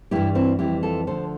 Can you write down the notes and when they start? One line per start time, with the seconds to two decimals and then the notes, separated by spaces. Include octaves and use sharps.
0.11 G2 E3 G3 E4 G4
0.35 C4 E4
0.59 F2 E3 G3 E4 G4
0.83 F4 A4
1.07 D2 D3 F3 A4 C5